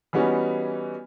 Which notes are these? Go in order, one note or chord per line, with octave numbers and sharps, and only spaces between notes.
E3 G3 B3 C#4 D#4 F#4